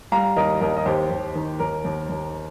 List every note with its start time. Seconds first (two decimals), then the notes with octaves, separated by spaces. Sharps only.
0.12 G3 F5 A#5
0.36 D#2 A#4 D#5
0.61 D#2 A#4 D#5
0.77 D#5
0.86 D#2 G4 C5
1.11 D#2
1.35 D#3
1.59 D#2 A#4
1.85 D#2
2.09 D#2